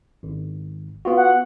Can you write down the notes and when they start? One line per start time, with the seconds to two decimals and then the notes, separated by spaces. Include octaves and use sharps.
0.23 G#1
1.05 B3 F4 F#4
1.17 F#5